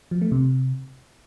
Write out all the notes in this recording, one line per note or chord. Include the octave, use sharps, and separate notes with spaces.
F3
A3
C3